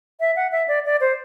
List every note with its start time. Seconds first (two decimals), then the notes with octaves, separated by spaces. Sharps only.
0.20 E5
0.36 F#5
0.52 E5
0.68 D5
0.85 D5
1.01 C5